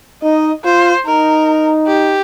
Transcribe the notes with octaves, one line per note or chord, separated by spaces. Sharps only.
D#4 D#5
F4 C5
D#4 A#4
G4